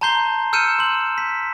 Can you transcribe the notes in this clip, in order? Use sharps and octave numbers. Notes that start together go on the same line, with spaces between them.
A5 A#5 C6 G6 C7 G7
E6 F6 G6 C#7 D#7 E7
C6 F#7
B6